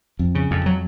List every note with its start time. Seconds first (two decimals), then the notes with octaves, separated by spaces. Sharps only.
0.19 F2
0.35 C#3
0.51 F2
0.66 F#3